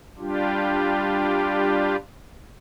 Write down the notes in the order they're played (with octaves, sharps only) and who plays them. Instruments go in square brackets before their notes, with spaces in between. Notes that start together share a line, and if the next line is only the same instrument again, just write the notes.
[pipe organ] G3 D4 F4 G4